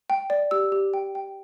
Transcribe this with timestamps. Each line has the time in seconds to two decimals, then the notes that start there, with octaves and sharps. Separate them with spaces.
0.10 G5
0.30 D5
0.51 G4 E6
0.72 G4
0.94 G5
1.15 G5